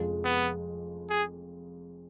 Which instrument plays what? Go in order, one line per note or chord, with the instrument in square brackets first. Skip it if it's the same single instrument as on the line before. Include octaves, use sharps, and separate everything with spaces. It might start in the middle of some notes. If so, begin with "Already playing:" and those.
Already playing: [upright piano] F1 F2 F3 G#3
[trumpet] B3
G#4